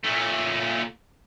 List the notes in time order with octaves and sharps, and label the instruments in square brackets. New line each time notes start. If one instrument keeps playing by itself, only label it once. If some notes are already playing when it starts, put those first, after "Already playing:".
[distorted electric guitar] A#2 A3